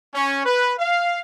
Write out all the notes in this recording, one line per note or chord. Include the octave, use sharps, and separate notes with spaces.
C#4
B4
F5